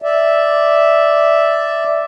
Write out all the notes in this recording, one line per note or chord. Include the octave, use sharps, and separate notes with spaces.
D5 E5